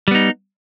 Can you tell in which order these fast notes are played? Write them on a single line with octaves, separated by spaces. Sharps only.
G3 B3 D#4